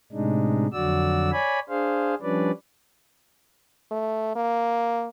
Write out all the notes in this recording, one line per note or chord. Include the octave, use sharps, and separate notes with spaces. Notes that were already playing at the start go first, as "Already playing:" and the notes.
A2 C3 G#3 D4 D#4
F2 D3 F#3 F#4 D5 E6
C#5 D5 G#5 B5
D4 G#4 C5 F5
F3 G3 C#4 D4 B4 D5
A3
A#3